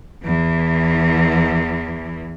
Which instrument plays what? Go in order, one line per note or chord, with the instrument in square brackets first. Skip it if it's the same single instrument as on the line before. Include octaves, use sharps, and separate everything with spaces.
[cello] E2 E3